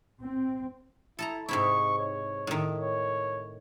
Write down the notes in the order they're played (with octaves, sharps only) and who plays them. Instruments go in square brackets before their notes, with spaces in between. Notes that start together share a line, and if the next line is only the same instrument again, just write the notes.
[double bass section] C4
[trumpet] E4 [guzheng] A4 A5 A#5
[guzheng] G#2 C3 E4 [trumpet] C#6
[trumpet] C#5
[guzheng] A2 D#3
[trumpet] C#5